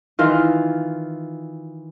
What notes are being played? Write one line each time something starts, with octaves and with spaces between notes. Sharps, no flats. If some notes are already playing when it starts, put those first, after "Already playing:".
D#3 E3 F4